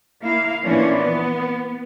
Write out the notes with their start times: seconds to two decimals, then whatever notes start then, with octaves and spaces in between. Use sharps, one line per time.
0.22 A#3 E4 F5
0.62 A#2 E3 F3 C#4 D4 E4
0.98 B3